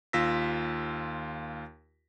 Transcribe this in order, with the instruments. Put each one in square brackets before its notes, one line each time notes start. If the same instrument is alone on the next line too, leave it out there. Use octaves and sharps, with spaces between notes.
[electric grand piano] D#2 F4 E6 A#6 B6